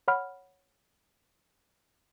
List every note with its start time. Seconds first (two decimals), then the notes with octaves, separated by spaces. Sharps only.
0.08 C#5 F#5 B5 F6